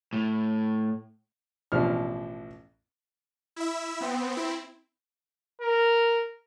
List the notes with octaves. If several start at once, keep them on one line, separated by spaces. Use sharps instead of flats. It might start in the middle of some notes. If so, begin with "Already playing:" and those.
A2
A1 B2 F3 D4 F6
E4 E5
B3 C4
C4 E4
A#4